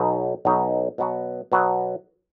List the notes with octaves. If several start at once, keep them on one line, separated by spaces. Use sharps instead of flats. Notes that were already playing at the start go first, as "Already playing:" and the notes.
Already playing: B1 B2 F#3 D#4
B1 B2 F#3 D#4
B2 F#3 B3 F#4
B2 F#3 B3 F#4